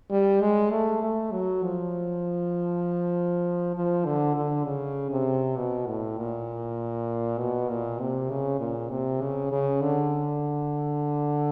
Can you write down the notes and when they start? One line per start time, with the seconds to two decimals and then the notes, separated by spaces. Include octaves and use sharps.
0.10 G3
0.41 G#3
0.71 A3
1.02 A3
1.32 F#3
1.63 F3
3.75 F3
4.05 D3
4.36 D3
4.65 C#3
5.11 C3
5.56 B2
5.87 A2
6.18 A#2
7.39 B2
7.69 A#2
8.00 C3
8.30 C#3
8.60 A#2
8.90 C3
9.21 C#3
9.52 C#3
9.82 D3